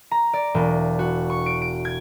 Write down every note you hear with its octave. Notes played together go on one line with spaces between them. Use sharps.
A#5
D5
E1
F#4
C#6
D7
D7
G#6